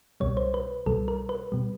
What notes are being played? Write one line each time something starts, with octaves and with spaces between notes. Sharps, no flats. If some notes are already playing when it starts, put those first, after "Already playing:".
C2 B2 G3 C#5
C5
B4
C2 B2 G3 A4
A#4
B4
B2 G3